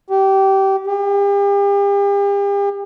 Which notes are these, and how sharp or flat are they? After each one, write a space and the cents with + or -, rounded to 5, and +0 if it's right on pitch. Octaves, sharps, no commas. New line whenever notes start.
G4 -20
G4 +40